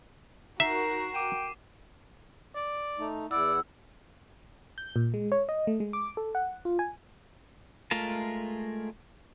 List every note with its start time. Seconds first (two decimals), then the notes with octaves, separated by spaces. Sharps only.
0.60 D#4 F#4 A#4 E5 C7 E7
1.14 G5 D6 D#7 E7
2.55 D5
2.99 A3 D#4
3.31 E2 E4 D5 F#5 E6
4.78 G6
4.96 A#2
5.14 G#3
5.32 C#5
5.49 D#5
5.67 A3
5.80 G#3
5.93 D6
6.17 A4
6.35 F#5
6.65 F4
6.79 G#5
7.91 G#3 A3 F4 A#4 A5